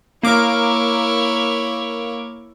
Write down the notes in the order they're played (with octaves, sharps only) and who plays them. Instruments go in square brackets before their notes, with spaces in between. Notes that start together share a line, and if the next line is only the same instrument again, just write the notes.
[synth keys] A#3 D6 [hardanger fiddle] E4 C#5